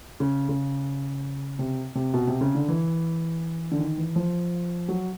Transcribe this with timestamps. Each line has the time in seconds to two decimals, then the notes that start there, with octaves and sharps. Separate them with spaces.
0.20 C#3
0.49 C#3
1.59 C3
1.95 C3
2.14 B2
2.27 C3
2.41 C#3
2.55 D3
2.68 E3
3.72 D3
3.79 D#3
3.97 E3
4.16 F3
4.88 F#3